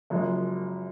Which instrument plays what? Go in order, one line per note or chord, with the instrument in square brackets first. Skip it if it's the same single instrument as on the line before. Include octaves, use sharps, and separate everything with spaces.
[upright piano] F#1 F#2 C#3 F3 G#3